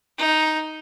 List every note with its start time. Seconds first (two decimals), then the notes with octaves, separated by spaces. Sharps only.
0.18 D#4